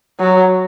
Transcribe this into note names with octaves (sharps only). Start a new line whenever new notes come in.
F#3